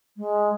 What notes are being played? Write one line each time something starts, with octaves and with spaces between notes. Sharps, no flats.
G#3